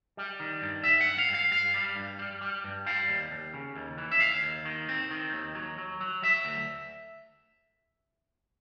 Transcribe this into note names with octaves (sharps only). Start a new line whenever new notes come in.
G3
D#3
G2
G2 E5
F#5
G2
F5
G2
F5
G2 F5
G3
G2
G3
G3
G2
G3 F5
D#2
D#2
C#3
D#2
E3
E5
D#2 F5
D#2
D#3
C4
D#3
D#2
F#3
F#3
F#3
F#3 E5
D2